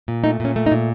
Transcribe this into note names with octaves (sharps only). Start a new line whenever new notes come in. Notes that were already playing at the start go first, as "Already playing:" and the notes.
A#2
A3 D#4
A#2 C#4
A3
D#4
A#2